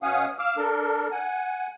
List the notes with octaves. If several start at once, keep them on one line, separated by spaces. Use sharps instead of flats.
B2 C#4 F5 F#5 G#5 D#6
F5 D6 E6 F6
D4 A4 A#4
F#5 G#5